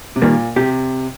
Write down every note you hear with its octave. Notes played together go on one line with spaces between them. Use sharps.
C3
A#2 D#3 G3 A#3
C3 G4